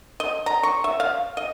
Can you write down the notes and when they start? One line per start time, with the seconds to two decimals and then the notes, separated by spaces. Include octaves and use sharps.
0.20 D#5
0.46 A#5
0.63 C#6
0.84 E5
1.00 F5
1.37 D#5